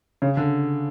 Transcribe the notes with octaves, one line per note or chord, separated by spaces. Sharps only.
C#3
D3